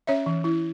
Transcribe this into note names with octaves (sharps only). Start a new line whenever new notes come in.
C#4 C#5 E5
E3
E4